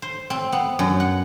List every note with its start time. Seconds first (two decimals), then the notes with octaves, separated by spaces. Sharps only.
0.02 C5
0.30 C4
0.52 B3
0.79 F#2
1.00 F#5